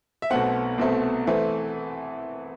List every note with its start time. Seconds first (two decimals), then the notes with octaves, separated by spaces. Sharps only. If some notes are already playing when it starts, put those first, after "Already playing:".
0.22 E5
0.30 B1 B2 A3 C4 F#5
0.78 C2 B2 A3 C4
1.27 E3 A3 C4